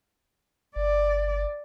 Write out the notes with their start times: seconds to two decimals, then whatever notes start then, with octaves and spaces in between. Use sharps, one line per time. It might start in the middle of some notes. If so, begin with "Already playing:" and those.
0.76 G1 D5